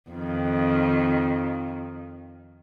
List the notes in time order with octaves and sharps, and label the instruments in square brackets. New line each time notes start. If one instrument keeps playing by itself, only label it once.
[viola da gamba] F2 D#3